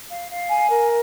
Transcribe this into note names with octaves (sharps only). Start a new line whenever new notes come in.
F5
F5
G#5
A#4